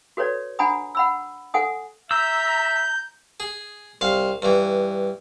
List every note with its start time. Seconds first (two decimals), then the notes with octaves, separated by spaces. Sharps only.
0.17 F#4 A4 B4 C#5 D5
0.59 D4 F#5 G#5 A#5 B5 D#6
0.95 F#5 B5 E6
1.54 A4 F#5 G#5 D#6
2.11 E5 A#5 E6 G6
3.40 G#4
4.01 C2 F5
4.42 G2 E3